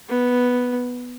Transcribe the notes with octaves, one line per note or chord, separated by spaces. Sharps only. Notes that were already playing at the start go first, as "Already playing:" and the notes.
B3